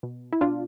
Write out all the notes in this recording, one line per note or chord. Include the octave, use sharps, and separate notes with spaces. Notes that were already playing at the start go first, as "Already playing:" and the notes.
B2
E4
B2 D4 F4